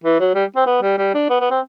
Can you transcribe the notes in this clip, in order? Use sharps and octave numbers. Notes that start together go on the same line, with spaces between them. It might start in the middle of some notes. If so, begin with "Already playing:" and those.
E3
F#3
G3
C4
B3
G3
G3
D4
B3
B3
C4